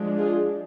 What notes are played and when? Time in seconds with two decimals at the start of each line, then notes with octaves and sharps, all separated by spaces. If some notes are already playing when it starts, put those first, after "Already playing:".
Already playing: F3 G#3 D4
0.17 F4 G#4